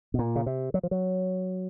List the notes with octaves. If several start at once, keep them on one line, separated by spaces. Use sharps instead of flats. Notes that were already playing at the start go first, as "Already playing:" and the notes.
B2
A#2
C#3
C3
F#3
F3
F#3